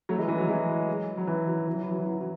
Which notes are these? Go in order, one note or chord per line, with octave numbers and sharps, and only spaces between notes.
F#3 A3
E3 G#3
E3
F#3
E3 G#3
F#3
E3
F#3
E3
F#3
E3
F#3
E3
F#3
E3
F#3